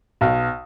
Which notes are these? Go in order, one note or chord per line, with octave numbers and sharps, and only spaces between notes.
B1